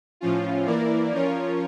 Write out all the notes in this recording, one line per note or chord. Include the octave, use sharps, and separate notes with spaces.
A2 F3 C#4 F4
E3 A#3 E4 A#4 D5
F3 C#4 F4 A#4 C#5